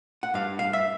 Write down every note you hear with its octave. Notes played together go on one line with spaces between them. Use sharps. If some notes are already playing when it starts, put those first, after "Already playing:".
F#5
G2 F5
F5
E5